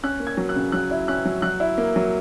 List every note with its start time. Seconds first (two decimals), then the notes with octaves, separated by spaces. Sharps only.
0.03 C#4 F#6
0.20 A#3
0.27 G#6
0.37 F#3
0.49 F#6
0.56 C#3
0.72 F#3 F#6
0.91 E4
1.08 C#4 F#6
1.25 F#3
1.42 F#3 F#6
1.60 E4
1.78 A#3
1.96 F#3